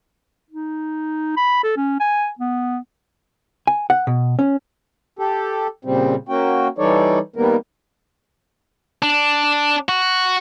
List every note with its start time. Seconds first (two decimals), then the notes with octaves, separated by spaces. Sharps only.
0.50 D#4
1.37 B5
1.63 A4
1.76 C#4
2.00 G#5
2.39 B3
3.67 G#5
3.90 F#5
4.07 B2
4.39 C#4
5.19 G4 A4
5.85 A#2 C#3 G3 C4
6.29 A#3 C#4 F#4 G5
6.78 E3 G3 D#4 A4 C#5 D5
7.36 D#3 G3 A#3 B3 A#4
9.03 D4
9.89 F#4